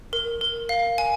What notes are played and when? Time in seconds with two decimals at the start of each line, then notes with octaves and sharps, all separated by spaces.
0.13 A#4
0.41 A#4
0.69 F5
0.98 G#5